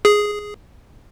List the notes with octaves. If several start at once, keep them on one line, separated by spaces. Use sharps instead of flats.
G#4